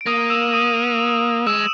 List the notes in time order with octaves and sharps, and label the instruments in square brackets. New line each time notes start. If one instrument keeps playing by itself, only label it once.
[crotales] D7
[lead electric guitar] A#3 [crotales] D#6 D#7
[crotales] E6 E7
D#6 D#7
[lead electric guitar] G#3 [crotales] E6 E7